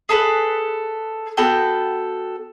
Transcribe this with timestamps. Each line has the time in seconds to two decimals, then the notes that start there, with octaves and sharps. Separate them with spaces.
0.09 G#4 A4 B4
1.37 B3 F#4 A4 G5